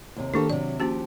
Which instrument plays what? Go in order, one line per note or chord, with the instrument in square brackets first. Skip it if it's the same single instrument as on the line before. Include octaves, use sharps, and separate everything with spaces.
[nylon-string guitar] D#2 C3
[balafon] D#3 D4 [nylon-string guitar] A#3 G4 A4
[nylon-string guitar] C3 F#3 [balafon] D5
[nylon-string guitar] F3 G4 [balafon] A#3 C#4 F#4